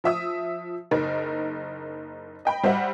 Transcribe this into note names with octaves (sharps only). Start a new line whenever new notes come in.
F3 E5 D#6
F#1 D#4 A#4
D#5 G5 B5
G3 C5 D#5 E5 F#5